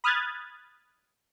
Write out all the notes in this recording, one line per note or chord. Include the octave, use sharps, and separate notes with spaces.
B5 D#6 F6 F#6 G#6 A6